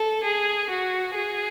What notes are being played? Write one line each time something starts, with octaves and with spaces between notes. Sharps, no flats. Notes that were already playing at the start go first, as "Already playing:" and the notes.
Already playing: A4
G#4
F#4
G#4